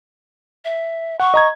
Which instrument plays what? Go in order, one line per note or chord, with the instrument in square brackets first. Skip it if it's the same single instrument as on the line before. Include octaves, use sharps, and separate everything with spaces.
[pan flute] E5
[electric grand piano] F#5 [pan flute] C#6
[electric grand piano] D#5 A#5 G#6